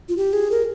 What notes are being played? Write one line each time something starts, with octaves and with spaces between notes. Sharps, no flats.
F4
G4
G#4
A#4